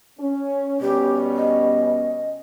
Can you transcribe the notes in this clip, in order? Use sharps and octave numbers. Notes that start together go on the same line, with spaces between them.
C#4
B2 G3 C#4 G4
D#5